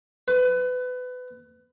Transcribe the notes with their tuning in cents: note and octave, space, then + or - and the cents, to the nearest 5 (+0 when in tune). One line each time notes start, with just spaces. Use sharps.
B4 +25